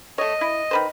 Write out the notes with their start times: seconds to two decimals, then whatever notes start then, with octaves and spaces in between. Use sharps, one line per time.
0.18 A3 C#5 D#5
0.41 E4
0.71 D#3 B4 C5